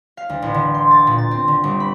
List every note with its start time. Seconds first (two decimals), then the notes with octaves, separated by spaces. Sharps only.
0.17 F5
0.29 D2
0.42 A1
0.54 D3
0.75 C6
0.91 A6
1.07 A#2
1.18 A6
1.31 C4
1.48 D3
1.64 G1
1.80 B5